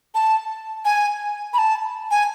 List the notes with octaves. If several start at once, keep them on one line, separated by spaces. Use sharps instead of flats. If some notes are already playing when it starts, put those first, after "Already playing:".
A5
G#5
B5
A5
G#5